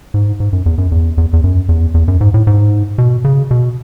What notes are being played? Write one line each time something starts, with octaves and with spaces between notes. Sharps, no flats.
G#2
G#2
F#2
E2
F#2
E2
E2
E2
F#2
E2
E2
F#2
G#2
A2
G#2
B2
C#3
B2